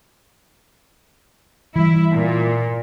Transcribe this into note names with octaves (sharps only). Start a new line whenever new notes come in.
E3 G3 E4
A#2